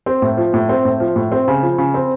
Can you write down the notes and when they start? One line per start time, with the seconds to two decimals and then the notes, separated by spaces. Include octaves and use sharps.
0.06 C4
0.22 A2
0.37 F3
0.54 A2
0.69 C4
0.85 A2
1.00 F3
1.16 A2
1.32 C4
1.48 C#3
1.62 F3
1.78 C#3
1.94 C4